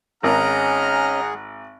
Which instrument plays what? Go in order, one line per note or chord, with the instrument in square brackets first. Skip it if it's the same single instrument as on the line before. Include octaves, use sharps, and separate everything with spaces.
[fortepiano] G#1 A#4 [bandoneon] C#4 D#5 [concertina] G#4 [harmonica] F#5 A#5 F6